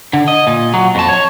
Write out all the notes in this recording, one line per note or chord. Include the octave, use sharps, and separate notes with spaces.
D3
D#5
A#2
F#3
F2 A5
C#5